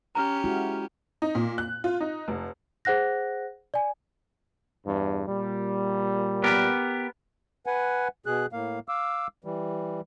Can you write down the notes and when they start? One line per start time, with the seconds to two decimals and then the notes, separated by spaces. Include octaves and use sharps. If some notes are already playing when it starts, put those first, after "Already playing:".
0.15 C#4 G4 A#5 F6
0.44 G#3 E4 F#4
1.22 D#4
1.35 A#2
1.58 F#6
1.84 F4
2.00 D#4
2.28 F1
2.85 G#4 C5 F#5 F#6 A#6
3.74 D5 G#5
4.86 E2 G2
5.28 A#2 G3
6.44 B3 G4 A#4
7.66 B4 F#5 G#5
8.26 B2 G#4 F#6
8.53 A2 A#3 F5
8.89 F5 D6 E6
9.44 E3 G3